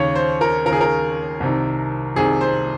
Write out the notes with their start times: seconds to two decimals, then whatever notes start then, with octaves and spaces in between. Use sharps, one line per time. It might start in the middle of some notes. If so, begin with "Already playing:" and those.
Already playing: D#2 C#3 C#5
0.15 C5
0.41 A#4
0.65 C#3 A#4
0.70 D#2 G#4
0.81 A#4
1.40 C2 C3 D#3
2.15 C2 C3 D#3 G#4
2.41 C5